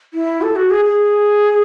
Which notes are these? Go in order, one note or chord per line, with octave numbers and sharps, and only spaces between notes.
E4
A4
F#4
G#4
G#4